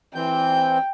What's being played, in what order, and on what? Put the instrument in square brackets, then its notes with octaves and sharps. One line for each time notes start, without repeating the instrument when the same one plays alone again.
[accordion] E3 C4 G6 [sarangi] G5